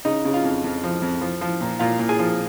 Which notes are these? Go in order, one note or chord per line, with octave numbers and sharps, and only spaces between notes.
C#3 D#4 D#5
C#3
F4 F5
F2
F2
F3
F2
F3
F3
A#2
A#2 F4 F5
A#2
G#4 G#5
F3